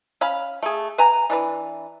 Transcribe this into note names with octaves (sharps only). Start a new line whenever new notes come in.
C#4 F5 B5
A3 G#4
B4 G#5 A#5
E3 D4 B4